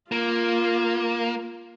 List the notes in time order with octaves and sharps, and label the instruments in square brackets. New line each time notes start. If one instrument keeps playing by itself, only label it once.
[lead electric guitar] A#3 [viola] F4